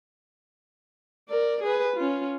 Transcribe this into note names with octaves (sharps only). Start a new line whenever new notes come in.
A#4 D5
G#4 B4
C#4 F4